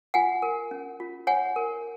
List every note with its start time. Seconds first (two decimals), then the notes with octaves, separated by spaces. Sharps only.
0.14 F4 F#5 G#5
0.42 A#4
0.71 C#4
1.00 F4
1.27 C#5 F#5 G#5
1.56 A#4